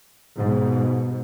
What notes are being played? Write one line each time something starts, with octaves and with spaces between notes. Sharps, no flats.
G#2 B2